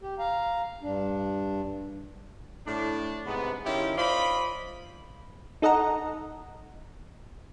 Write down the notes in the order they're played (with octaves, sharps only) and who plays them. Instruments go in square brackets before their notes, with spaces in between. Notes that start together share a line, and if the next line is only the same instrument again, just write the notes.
[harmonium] G4
F5 A#5
G2 D4
[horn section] A2 D4
G#2 C3 B3
D#3 C#4 E4 F4 G4
F4 C5 D5 D#5 B5
[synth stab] D#4 A4 D#5 F#5 A#5